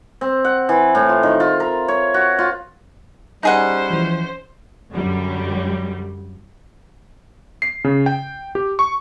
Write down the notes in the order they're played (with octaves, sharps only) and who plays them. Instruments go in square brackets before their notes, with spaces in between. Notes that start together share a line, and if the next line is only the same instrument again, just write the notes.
[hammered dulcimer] C4
F#5
E3
A2
F4
D#3
F4
A#4
C#5
F#4
F4
[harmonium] G3 [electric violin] C#4 C5 [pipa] D#4 G#4 F#5
[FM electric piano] E3 F3
[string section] F#2 D3 F#3 G3
[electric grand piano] C7
C#3
G5
G4
C#6